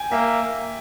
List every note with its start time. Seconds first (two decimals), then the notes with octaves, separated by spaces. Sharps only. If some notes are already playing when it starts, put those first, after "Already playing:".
Already playing: G5 G#5
0.12 A#3 E5